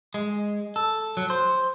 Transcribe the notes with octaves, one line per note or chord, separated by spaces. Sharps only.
G#3
A4
F#3
C5